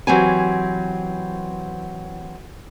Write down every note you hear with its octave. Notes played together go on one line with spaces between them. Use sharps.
E3 F#3 C4 G4 G#5